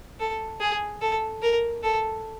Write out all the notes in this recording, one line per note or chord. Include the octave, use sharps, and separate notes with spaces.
A4
G#4
A4
A#4
A4